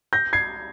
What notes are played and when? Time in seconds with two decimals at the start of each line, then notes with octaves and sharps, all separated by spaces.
0.13 G6 A#6
0.33 G#6 C7